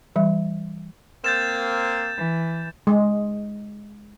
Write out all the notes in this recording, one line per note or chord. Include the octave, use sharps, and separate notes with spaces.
E3 G3 E5
A#3 C4 G6 A6 E7
E3
G#3